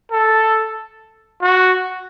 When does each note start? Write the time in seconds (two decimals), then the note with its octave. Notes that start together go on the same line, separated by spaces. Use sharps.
0.11 A4
1.42 F#4